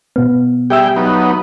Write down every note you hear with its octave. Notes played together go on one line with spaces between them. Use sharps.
B2 B3
G3 G4 G#4 E5 G5 E6
F#3 B3 D#4